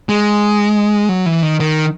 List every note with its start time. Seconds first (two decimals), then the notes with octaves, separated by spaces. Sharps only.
0.09 G#3
1.09 F#3
1.26 E3
1.43 D#3
1.60 D#3